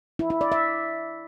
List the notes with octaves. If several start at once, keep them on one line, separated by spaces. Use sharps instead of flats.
E4
E4
D5
E5